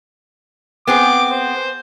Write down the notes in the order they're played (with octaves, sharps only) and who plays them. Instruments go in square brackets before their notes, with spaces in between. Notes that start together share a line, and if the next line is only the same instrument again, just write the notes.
[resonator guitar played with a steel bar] B3 C4 G#4 [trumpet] D6
[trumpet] C5